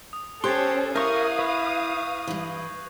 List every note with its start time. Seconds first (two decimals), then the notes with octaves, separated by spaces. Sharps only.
0.13 D#6
0.44 C#4 G4 A4 C5 C6 F#6 G#6 C7
0.96 E4 A#4 F5 C#6 D#6 G6 A#6
1.39 B4 C#6 F7
2.27 G2 E3